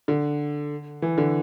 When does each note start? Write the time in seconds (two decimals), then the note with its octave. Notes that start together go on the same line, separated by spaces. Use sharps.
0.08 D3
1.02 E3
1.18 D3